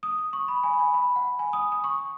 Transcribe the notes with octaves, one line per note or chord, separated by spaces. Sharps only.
D#6
D#6
C#6
B5
G#5
B5
G#5
B5
F#5
G#5
D#6
D#6
C#6